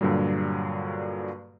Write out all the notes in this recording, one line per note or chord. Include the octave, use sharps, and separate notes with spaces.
G2 A#2 D3 F#3 G3